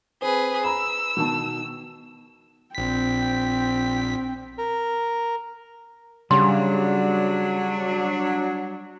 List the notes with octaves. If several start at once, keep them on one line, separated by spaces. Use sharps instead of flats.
C4 G#4 B4
A#5 B5 E6
B2 D#3 A5
A#1 C4 G5 B6
A#4
C#3 F#3 G3 D4 C6